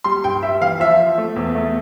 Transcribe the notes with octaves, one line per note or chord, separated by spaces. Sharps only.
G3 C6
G2 G5
G3 E5
E3 F5
F3 E5
F3
A3
E2
A3